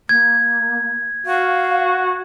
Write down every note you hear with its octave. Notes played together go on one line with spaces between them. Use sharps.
A#3 G#6
F#4 F5